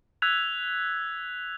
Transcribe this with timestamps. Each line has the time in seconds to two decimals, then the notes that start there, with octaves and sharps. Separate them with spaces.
0.22 E6 F#6 G#6 B6 F7